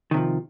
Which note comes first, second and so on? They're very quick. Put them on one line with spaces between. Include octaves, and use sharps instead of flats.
D#3 C3 F3